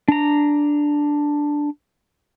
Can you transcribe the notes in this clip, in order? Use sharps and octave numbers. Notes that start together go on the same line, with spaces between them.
D4 A#5